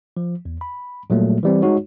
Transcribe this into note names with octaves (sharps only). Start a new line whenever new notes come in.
F3
E2
B5
A#2 F#3 G3 A3 A#3
E3 G3 C4
G#3 D#4 F#4 C#5